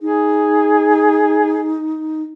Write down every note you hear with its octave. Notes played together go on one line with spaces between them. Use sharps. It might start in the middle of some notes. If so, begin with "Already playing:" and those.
D#4 G#4